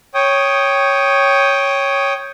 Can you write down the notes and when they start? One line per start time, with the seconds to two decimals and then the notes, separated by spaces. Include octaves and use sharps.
0.14 C#5 G5 D#6